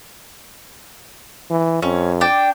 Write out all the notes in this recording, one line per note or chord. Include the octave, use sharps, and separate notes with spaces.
E3
F2 C#4
D4 G5